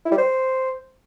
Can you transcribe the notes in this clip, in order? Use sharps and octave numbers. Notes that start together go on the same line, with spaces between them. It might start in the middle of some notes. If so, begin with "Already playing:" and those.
E4
G3
C5